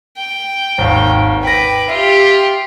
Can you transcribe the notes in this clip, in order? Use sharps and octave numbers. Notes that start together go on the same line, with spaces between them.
G5
G#1 D#2
B4 G5 D6 A#6
F4 G4 E5